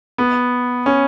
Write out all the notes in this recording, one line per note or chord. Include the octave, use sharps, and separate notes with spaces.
B3
C#4